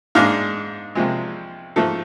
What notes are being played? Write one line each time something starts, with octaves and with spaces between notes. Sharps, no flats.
G#2 G#3 D4 F5
C2 C3 F3 G#3
G#2 F3 A3 A4